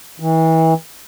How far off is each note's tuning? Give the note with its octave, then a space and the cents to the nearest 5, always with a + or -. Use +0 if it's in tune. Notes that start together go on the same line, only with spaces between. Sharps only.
E3 -30